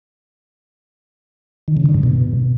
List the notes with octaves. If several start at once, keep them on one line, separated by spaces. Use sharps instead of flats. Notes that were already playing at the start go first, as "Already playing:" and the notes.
D#3
C#3
D3
G#2
B2